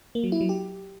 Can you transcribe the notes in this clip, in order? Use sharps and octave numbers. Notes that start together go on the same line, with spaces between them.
A#3
F#3
E4
F#3
G4